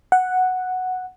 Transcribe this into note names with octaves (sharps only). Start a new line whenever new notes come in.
F#5